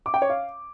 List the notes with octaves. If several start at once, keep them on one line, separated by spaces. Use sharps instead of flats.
D6
G5
C#5
F5